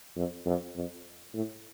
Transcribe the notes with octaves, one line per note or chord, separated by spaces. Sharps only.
F2
F2
F2
A2